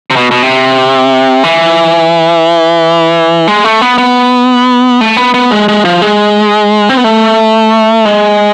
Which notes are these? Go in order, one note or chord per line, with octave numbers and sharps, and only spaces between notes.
C3
B2
B2
C3
E3
G#3
A3
B3
B3
A3
B3
B3
G#3
G#3
F3
G#3
C4
B3
A3
G#3